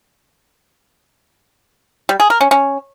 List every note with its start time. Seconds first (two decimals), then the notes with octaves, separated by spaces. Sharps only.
2.09 G3
2.20 G#4
2.30 A#4
2.41 C#4
2.51 C#4